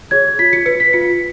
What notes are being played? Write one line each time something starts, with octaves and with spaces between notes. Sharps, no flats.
G#4 C#5 G#6
F4 B6
C#7
B4 C#7
B6
F4 C#7